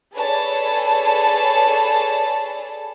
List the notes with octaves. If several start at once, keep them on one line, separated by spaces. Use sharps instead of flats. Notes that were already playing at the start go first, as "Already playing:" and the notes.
G#4 A4 B4 C#5 D5 A5